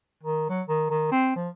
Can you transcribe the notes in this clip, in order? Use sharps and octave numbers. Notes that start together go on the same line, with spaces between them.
D#3
F#3
D#3
D#3
C4
F3